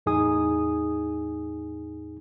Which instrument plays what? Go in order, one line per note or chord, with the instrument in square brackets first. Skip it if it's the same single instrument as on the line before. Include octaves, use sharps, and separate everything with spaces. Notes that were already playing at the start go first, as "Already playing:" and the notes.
[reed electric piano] E2 A2 D#4 G#4 G#5 D#6